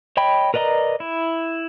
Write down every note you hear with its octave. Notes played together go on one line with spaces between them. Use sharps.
C#5 D#5 G5 B5
A#4 B4 D5 D#5 A#5
E4